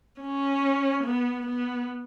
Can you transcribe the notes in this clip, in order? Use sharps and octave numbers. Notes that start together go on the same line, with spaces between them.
C#4
B3
B3